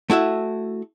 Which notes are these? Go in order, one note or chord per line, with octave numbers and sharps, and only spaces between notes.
A3 E4 F#4 E5